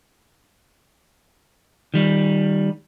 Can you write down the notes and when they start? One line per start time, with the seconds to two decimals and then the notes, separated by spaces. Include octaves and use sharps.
1.94 D#3 G3